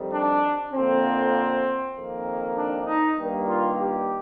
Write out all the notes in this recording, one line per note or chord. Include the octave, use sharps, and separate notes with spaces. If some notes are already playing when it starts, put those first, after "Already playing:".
Already playing: F2 D#3 G3
D4
F2 D3 F3 A#3 C4
F2 D#3 A#3
D4
D#4
G2 D#3 G3 A#3
F4
G4